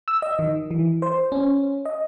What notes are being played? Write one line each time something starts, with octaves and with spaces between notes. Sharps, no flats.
E6
D#5
D#3
E3
C5
C#4
D#5